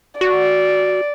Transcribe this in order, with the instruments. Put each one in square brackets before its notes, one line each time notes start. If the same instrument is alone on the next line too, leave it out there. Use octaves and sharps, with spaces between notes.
[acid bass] F#4 [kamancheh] D5